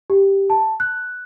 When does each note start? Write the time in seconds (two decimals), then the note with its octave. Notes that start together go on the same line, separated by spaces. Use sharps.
0.10 G4
0.50 A5
0.80 F#6